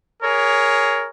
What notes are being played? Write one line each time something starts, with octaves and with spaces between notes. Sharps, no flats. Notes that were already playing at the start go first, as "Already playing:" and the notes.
G#4 A#4 C#5